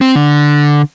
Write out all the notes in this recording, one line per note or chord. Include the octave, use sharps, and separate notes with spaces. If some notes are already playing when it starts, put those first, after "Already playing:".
C4
D3